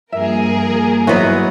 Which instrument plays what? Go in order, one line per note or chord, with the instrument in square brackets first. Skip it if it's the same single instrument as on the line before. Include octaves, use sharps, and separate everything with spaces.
[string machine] G2 F3 A#3 [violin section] G#4 A#4 [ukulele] E5
[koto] F#3 B3 [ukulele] E4 C5 D#5